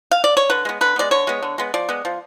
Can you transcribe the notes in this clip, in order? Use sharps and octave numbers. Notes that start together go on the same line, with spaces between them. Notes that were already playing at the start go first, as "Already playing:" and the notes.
F5
D5
C#5
D3 B4
G#3 B3
D3 B4
G#3 B3 D5
D3 C#5
G#3 B3
D3
G#3 B3
F3 D5
G#3 B3
F3